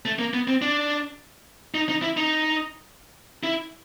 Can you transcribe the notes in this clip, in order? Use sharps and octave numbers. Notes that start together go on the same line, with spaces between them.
A3
A#3
B3
C4
D4
D#4
D#4
E4
D#4
E4